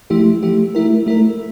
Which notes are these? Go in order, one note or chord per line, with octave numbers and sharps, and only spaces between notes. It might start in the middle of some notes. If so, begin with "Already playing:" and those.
F3 A3 E4 G4
F3 A3 E4 G4
A3 E4 A#4
A3 E4 A#4